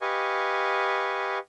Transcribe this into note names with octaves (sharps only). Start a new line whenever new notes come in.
G4 B4 D#5 F5 G#5 C#6